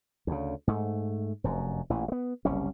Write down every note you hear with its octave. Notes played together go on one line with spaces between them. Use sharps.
D2 C#3
G#2 A3
F1 F#2
A1 A#2 E3
G#3 B3
F#1 C2 G3 C#4